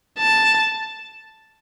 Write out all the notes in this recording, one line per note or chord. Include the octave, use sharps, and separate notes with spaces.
A5